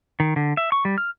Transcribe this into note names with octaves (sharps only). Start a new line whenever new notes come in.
D#3
D3
E5
C#6
G3
F6